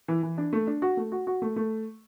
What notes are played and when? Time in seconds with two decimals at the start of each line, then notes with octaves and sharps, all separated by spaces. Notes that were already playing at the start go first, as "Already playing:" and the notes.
0.08 E3
0.23 E3
0.38 D4
0.53 A3
0.67 D4
0.82 F#4
0.97 A3
1.12 F#4
1.27 F#4
1.42 A3
1.56 A3